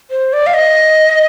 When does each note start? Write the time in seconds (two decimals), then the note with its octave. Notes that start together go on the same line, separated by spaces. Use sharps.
0.10 C5
0.33 D5
0.47 F5
0.54 D#5